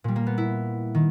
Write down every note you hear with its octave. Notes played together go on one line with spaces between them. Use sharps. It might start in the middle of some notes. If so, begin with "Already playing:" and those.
A#2 G3
A#3
B3
E4
D#3